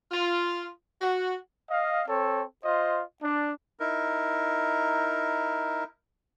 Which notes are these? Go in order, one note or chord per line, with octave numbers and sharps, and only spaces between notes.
F4
F#4
D#5 F5
C4 A4 C#5
F4 C5 D#5
D4
D#4 E4 A#4